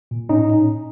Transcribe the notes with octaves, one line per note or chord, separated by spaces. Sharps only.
A#2
A2 C#4 D#4